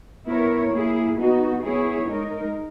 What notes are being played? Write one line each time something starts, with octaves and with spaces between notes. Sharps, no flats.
B3 E4 A#4 C#5
A#3 E4 G#4
B3 D#4 F#4
B3 E4 G#4 C#5
G#3 D#4 A#4